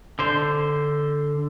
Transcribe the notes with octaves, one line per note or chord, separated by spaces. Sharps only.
D3 C5